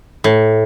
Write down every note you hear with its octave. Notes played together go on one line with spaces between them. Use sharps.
A2